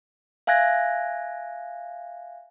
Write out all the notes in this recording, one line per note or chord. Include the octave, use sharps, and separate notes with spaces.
E5 F5 G#5 F#6 G#6 A#6